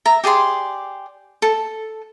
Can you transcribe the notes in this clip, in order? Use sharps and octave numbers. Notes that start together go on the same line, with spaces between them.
E5 A#5
G4 G#4 D5 C6
A4